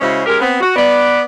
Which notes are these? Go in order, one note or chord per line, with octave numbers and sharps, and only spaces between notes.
C#3 G#3 C#4 E4 F#4 C5
G#3 C#4 G4 A#4
B3 C4
F#4
B3 D5